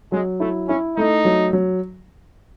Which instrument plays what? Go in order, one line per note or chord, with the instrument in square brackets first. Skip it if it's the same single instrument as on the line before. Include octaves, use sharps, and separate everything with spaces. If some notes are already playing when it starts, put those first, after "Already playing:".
[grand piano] F#3 [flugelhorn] G#3
[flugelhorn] A3 [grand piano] E4
[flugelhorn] C#4 [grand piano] E4
[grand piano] A3 [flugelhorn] D#4
[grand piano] F#3
F#3